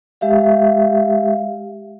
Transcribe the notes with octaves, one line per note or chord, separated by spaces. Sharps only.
G#3 G4 E5 F5